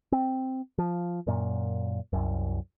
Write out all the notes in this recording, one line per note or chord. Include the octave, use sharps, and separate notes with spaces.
C4
F3
F#2 A#2
C2 F#2